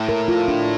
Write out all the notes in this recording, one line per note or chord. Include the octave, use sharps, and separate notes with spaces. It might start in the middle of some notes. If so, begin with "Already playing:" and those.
Already playing: A2
A#4
F4
D4